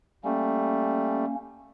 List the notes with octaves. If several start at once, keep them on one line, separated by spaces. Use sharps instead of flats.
G3 A3 A#3 C#4